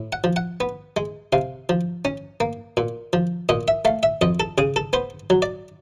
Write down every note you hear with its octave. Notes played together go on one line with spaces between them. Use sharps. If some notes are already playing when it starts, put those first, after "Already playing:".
Already playing: A2
F#5
F3
F#5
B3
G#3
C3 F5
F3
C#4
A#3
A#2
F3
A#2 D#5
E5
A3 F5
E5
F2 D#5
A4
C#3 G#4
A4
B3 C5
F#3
D5